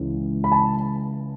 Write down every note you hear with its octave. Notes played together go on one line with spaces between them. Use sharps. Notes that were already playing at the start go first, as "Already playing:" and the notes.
Already playing: C#2 C#3 E3
B5
A5